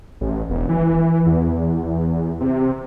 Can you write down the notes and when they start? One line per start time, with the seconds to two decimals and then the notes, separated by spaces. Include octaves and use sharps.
0.21 A1
0.50 E1
0.69 E3
1.26 E2
2.41 C3